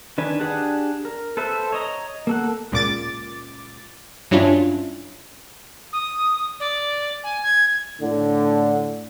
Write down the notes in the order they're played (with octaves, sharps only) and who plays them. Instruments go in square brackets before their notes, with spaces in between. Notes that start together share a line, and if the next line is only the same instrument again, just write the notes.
[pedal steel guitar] D#3 D4 B4 G#5
D4 G4 G#4 F#5
A#4
A4 B4 C5 E5
C#5 D#5 A#5
A#3 A4 F#5
[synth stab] C#2 A#2 D6 A6
G2 F#3 C#4 D4 E4 F4
[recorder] D#6
D5
G#5
G#6
[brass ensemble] A2 D3